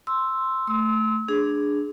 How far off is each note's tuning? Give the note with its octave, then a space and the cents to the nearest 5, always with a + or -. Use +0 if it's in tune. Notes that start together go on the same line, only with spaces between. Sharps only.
C6 +0 E6 +0
A3 +0 C6 -10 E6 -35
D4 +5 G#4 +0